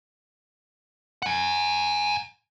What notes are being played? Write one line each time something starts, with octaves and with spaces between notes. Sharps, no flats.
F#5 G#5